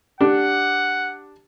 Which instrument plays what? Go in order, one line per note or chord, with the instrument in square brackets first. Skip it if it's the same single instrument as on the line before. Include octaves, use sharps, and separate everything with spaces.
[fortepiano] D4 G4 [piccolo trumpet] F#5